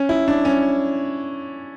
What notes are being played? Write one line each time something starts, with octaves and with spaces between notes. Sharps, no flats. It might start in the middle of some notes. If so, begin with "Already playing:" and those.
Already playing: C#4
E4
D4
C#4